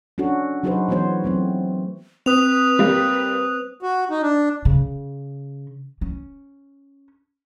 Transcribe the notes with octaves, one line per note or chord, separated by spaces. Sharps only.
C#4 D4 F#4 A4
F#3 D#4 F#4 G#4 B4 C5
E3 A3 B3 F#4 C5 C#5
F#3 A3 C4
C4 B4 D#6 F7
G3 A#3
F#4
D#4
D4
C#3
C#4